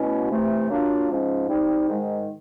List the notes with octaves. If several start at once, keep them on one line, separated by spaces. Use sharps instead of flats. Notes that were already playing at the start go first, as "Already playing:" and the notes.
Already playing: B2 F#3 A3 C#4 E4
C3 E3 A3
F#3 A#3 D4 F4
G#2 F3 G#3 C#4
G3 C4 D#4
G#2 D#3 G#3